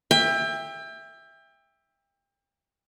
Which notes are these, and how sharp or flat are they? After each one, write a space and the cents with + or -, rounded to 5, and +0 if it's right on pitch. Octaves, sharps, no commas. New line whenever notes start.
E5 +0 G5 +30